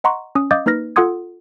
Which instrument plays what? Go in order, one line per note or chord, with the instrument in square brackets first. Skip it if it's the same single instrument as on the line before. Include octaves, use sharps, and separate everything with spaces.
[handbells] D#5 F#5 A#5 C6 C#6
C#4 D#6
D#5 F5 D6 D#6 G6 A6
A#3 D#4 B4 F6 A#6
F4 A4 F#5 C6 D#6 G#6